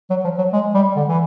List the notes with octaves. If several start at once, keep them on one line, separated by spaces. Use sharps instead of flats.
F#3
F3
F#3
G#3
G3
D3
E3